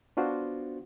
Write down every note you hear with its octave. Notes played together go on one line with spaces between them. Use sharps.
B3 D4 F4 F#4 C5